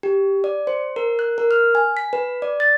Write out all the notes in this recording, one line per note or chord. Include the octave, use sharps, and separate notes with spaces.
G4
D5
C5
A#4
F#6
A#4
F6
G#5
B6
B4
D5
A6